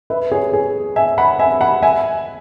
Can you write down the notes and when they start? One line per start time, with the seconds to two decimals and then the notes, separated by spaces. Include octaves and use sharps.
0.10 B4 E5
0.32 G#4 C#5
0.53 G#4
0.96 E5 G#5
1.18 F#5 B5
1.39 E5 G#5
1.61 F#5 B5
1.82 E5 G#5